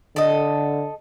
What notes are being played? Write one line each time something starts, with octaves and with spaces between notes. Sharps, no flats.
D3 A4 D#5